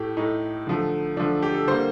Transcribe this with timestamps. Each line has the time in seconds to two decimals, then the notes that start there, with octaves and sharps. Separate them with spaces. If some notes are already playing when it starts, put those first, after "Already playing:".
Already playing: A2 A3 G4
0.17 A2 A3 D#4
0.67 D3 F3 A3
1.17 D3 F3 A3 D4
1.43 G4
1.54 A4
1.67 D3 G3 A#3 C5